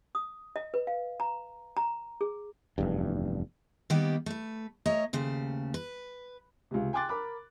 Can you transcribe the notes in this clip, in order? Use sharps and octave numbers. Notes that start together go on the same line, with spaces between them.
D#6
D#5
B4
F5
A#5
A#5
G#4
F1 E2 G2
D#3 G3 A#3 B3 G4
A3 B4
A3 C#5 D#5 A#5
D#2 C#3 A3 C5
B4
C#2 C3
G5 G#5 C6 D6 F#6 A6
A#4 B5 D6